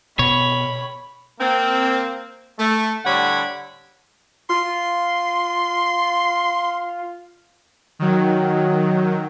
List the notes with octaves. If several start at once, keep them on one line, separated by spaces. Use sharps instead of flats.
B2 C#5 B5
A#3 C4
A3
A2 D3 G3 C#5 F#5 B5
F4 C6
D#3 F#3